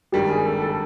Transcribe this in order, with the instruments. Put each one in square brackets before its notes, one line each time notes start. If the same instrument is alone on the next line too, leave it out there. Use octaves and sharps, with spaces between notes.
[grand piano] G#1 G2 D#3 G3 [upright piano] G4
[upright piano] G#4
A4
A4